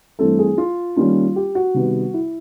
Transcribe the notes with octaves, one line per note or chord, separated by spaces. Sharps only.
G2 E3 A3 C4 A4
G#4
F4
D#3 G3 A#3 C#4 F4
G4
F#4
C3 D#3 G3 B3
E4